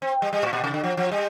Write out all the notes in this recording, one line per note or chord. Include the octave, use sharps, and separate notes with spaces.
C4
G3
G3
A2
A#2
C3
D3
F3
F3
G3